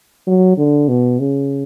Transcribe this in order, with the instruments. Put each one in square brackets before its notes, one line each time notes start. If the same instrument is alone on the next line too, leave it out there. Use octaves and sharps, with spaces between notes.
[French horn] F#3
D3
B2
C#3